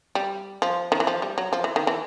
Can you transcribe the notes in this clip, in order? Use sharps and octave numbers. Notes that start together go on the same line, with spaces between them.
G3
F3
D#3
E3
F3
G3
F#3
F3
E3
D#3
E3